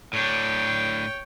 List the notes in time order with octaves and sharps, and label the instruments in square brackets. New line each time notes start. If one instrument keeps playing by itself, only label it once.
[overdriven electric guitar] A2 D4 [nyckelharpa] C#5 G5